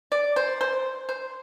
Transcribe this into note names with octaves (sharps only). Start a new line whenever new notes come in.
D5
C5
C5
C5